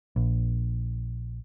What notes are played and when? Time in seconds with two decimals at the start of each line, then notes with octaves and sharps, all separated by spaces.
0.16 A#1